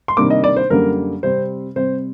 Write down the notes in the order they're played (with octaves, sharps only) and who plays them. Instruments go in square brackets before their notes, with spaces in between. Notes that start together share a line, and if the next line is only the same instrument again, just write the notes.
[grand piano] C6
C3 D#3 G3 A#3 D4 D6
D#5
D5
C5
F#2 D3 G3 A#3 A#4
C3 G3 C4 C5
C3 G3 C4 C5